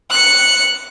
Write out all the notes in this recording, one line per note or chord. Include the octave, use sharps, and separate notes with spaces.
F#6 C#7